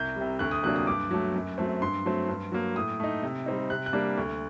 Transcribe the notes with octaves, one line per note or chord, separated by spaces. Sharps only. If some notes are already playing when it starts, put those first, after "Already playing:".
Already playing: C2 G6
G3
C3
D2 F#6
D#6
C3 F#3 A#3 D4 F#6
D#6
G2 D6
F#3 A3
F#2
F#3 A3 C4
G2 C6
F#3 A3 C4
G2
F#3 A#3
A2 D#6
A3 D#4
C3
G3 C4 D#4
C3 F#6
F#6
G3 A#3 D4
D2